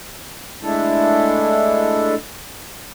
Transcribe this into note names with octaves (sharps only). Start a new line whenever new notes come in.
G#3 A3 D4 E4 A4